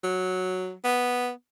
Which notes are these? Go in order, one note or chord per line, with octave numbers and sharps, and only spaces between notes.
F#3
B3